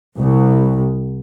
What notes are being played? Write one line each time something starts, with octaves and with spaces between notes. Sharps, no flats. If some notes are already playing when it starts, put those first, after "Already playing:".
C2